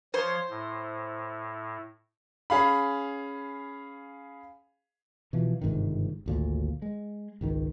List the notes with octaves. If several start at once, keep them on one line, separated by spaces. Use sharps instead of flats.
F3 C5 C#5
A2
C#4 G#4 F5 B5
B2 E3 F3
G1 G#2 C3 D#3
G#1 D2 A#2
G#3
G#1 C#2 D#3